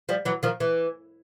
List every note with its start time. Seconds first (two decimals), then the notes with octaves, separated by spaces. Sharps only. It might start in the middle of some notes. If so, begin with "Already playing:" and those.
0.09 F3 G3
0.25 E3 F#3
0.43 D#3 F3
0.60 E3